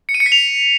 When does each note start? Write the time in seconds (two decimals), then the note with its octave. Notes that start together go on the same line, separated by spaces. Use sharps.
0.09 C#7
0.14 D#7
0.20 C#7
0.26 B6
0.32 F7